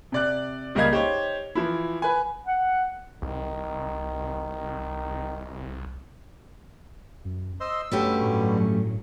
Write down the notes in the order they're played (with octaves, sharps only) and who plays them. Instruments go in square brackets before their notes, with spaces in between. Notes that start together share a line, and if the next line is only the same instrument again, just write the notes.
[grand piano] C3 D5 F#6
C#2 G3 A#3 D#5 F5 G#6
D#4 G4 C5 C#5
E3 F3 E4
B4 G#5
[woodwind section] F#5
[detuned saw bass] C2 [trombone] D#3
[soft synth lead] F#2
[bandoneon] C5 D#5 C6 [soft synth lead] E6
[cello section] G2 F#3 [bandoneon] B2 D3 G3 [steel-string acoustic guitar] A3 C#4 G4
[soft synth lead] A2